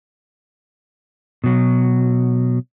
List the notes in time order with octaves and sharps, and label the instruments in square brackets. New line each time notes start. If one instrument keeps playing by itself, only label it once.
[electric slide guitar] B2 F#3